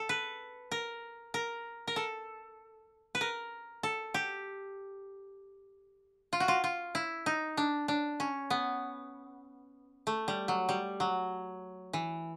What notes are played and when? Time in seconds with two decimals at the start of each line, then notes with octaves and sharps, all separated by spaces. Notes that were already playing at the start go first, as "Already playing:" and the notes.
Already playing: A4
0.09 B4
0.72 A#4
1.34 A#4
1.87 A#4
1.96 A4
3.15 B4
3.21 A#4
3.83 A4
4.14 G4
6.33 F4
6.40 F#4
6.48 F4
6.64 F4
6.95 E4
7.26 D#4
7.57 D4
7.88 D4
8.20 C#4
8.50 B3
10.07 A3
10.28 G3
10.48 F#3
10.69 G3
11.00 F#3
11.93 E3